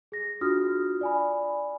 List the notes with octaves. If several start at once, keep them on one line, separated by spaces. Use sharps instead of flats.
G#4 A#6
D4 F4 F#4 D#6 F6
D5 G#5 B5